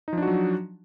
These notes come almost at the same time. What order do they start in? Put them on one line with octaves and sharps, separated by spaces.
D#4 F3 D4 F#4 F#3